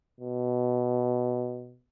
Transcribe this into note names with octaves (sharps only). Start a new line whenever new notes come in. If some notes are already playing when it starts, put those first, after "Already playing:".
B2